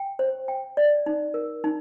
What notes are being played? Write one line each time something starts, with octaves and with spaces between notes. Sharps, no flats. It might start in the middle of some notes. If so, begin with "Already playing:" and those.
Already playing: G5
C5
G5
D5
D#4
A#4
D#4